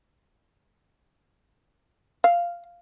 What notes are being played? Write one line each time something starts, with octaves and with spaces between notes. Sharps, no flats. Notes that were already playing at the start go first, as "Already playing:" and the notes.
F5